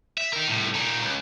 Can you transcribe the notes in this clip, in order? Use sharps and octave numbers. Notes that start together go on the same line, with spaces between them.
E5
D#4 A#4
C2 A2
A#2 D#4
C#2